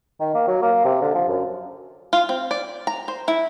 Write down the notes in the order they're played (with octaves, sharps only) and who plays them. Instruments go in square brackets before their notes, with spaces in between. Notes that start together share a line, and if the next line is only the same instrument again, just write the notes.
[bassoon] D#3
A#3
F#3
A#3
C3
D3
F3
F#2
[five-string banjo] F4
C4
D5
A#5
C5
E4